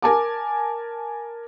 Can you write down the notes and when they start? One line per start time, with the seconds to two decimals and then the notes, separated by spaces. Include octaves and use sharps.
0.02 A#4 G#5 A5 D6